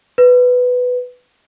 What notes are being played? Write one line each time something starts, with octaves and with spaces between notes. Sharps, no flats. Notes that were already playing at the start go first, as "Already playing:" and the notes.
B4